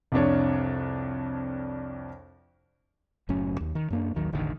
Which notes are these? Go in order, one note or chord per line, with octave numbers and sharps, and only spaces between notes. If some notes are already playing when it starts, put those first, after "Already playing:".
C2 F2 D4 C#5
F#1 A2 F#3 C#4
D#2
D#3
F#2 A#3 D4
A1 D#2 D#3 F#3
E1 A1 D3 D#3